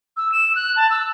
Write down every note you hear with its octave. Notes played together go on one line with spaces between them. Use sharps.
E6
E7
F#6
A5
E6